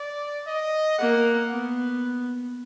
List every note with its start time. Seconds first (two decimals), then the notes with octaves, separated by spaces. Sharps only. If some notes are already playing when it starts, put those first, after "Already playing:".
Already playing: D5
0.47 D#5
0.99 A#3 F#5
1.51 B3